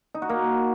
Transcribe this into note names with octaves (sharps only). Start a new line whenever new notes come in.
D#4
F#4
A#3